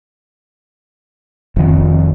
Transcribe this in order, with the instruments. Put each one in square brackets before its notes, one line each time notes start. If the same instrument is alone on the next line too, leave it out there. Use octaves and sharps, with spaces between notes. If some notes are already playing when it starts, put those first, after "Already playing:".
[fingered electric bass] F1 D#3